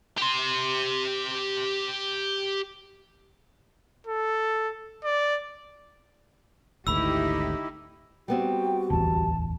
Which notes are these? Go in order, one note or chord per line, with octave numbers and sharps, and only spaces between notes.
G4 C6
A4
D5
G#1 D2 D#4 E4 G4 B5 E6
G3 B3 C4 F#4 G5
D1 A1 E2 A5